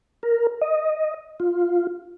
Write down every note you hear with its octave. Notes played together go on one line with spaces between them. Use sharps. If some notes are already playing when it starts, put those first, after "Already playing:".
A#4
D#5
F4